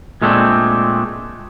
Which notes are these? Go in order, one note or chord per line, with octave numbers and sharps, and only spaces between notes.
A#2 G#3 A3 B3 C4 D4